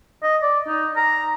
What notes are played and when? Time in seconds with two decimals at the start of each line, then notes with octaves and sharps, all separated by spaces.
0.23 D#5
0.42 D5
0.67 D#4
0.97 A#5